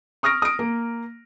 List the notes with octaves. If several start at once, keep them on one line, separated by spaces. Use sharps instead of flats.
C#6 D#6 F6 A#6 D7
D#6 D7
A#3